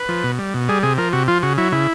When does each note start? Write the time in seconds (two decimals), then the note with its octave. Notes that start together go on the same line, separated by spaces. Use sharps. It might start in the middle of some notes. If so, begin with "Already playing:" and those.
Already playing: B4
0.09 F3
0.24 B2
0.39 G3
0.54 B2
0.69 G3 G#4
0.83 C3 G#4
0.98 F3 A#4
1.13 C3 F#4
1.28 F3 F4
1.43 C#3 F#4
1.58 F#3 E4
1.72 C#3 E4